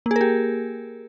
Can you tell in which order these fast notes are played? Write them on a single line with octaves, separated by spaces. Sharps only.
A#3 G#4 A#4 G4